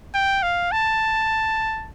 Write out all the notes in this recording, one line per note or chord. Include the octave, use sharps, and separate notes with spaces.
G5
F5
A5